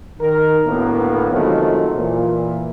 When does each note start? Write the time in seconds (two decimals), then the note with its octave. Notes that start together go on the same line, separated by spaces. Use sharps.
0.20 D#3 A#4
0.66 D2 A2 A#3 B3
1.31 C3 D#3 F3 F#3 G#3 A3
1.95 A#2 E3